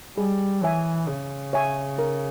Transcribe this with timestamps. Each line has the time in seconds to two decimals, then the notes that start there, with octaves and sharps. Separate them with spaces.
0.18 G3 G#4
0.63 E3 C#5 E5 G#5
1.08 C#3 G#4
1.53 C#5 E5 G#5
1.99 A#4